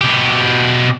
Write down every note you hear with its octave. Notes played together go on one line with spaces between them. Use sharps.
B2 G4